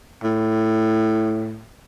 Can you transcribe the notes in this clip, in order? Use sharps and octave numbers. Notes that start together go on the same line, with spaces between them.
A2